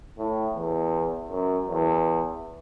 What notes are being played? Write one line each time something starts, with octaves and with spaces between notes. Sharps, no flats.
A2
E2
F#2
E2